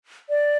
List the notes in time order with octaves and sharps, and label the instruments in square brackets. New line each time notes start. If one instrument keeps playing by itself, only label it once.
[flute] D5